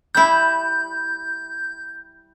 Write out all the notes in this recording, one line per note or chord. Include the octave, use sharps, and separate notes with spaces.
G3 E4 G6